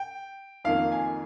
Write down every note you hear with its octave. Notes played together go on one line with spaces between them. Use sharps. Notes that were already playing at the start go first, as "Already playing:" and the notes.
Already playing: G5
F2 D#3 A#3 F5
G#5